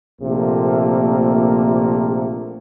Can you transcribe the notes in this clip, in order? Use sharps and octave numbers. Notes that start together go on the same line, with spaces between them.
A#1 C3 A3 A#3